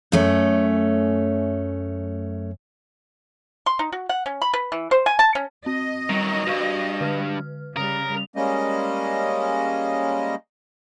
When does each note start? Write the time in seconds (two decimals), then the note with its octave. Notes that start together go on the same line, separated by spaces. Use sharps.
0.12 F#2 A3 C#4
3.66 C6
3.79 D#4
3.92 F#4
4.09 F#5
4.26 C#4
4.42 B5
4.53 B4
4.72 E3
4.91 C5
5.06 G#5
5.19 A5
5.35 C#4
5.66 C4 D#5
6.10 D#3 F#3 G3
6.47 C#2 G2 F#4 F5 C#6
7.01 D3 B4 F6
7.77 C#3 G3 A#4 D#6
8.36 G3 G#3 A#3 C#4 D#5